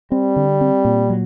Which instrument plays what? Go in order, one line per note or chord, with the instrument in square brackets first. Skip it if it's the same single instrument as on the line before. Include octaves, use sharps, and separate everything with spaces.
[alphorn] G3 [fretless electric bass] C4
[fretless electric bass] D3
C4
A#2
F#3